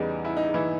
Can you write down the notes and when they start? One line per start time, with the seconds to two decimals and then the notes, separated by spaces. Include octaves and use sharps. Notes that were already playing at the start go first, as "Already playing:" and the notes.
Already playing: E2 C#3 E3 G3 D#4
0.25 E4
0.37 D#4
0.54 E3 E4